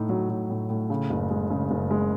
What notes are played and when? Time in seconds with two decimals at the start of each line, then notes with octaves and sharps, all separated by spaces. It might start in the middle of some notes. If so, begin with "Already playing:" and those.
Already playing: A2 D#4
0.09 F#3
0.29 F#3
0.50 A2
0.70 A2
0.90 C#3
1.10 F#1
1.30 G#3
1.50 C#3
1.71 F#1
1.91 G#3